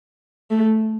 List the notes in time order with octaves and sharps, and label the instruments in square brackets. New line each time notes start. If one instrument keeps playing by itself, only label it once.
[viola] A3